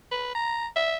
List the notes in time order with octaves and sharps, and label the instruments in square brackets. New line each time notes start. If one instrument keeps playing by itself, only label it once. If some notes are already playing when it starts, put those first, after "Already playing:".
[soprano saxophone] B4
A#5
E5